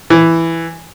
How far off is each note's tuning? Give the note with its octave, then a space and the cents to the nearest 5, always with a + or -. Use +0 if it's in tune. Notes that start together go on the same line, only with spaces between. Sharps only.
E3 +5